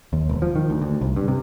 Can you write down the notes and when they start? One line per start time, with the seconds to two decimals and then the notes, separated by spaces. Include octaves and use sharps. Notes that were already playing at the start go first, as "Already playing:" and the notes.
0.13 D#2
0.29 E1
0.42 F3
0.56 D#3
0.70 D2
0.81 D2
1.01 C2
1.16 G2
1.28 C3